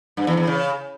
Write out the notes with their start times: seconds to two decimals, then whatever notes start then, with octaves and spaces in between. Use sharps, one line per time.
0.17 G2
0.27 E2
0.37 E2
0.47 C#3